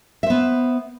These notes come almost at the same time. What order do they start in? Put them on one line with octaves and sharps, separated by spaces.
E5 C5 B3